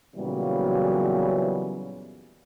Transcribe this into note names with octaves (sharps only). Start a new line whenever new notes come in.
A#2 C#3 E3 F#3 G3 B3